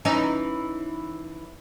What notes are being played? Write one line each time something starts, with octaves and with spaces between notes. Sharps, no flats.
E3 C#4 D#4